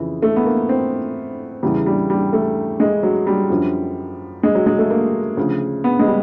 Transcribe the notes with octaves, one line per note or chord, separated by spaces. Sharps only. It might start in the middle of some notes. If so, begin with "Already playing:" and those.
Already playing: F2 C#3 E3
A3
B3
A#3
C4
E2 C#3 E3 G3
G3
G3
A3
G#3
F#3
G3
F#2 D3 F3
G#3
F#3
G#3
A3
A#3
D2 C#3 F3
B3
G#3
G3